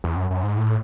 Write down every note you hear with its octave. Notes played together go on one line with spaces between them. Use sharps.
E2
F#2
F#2
G#2
A2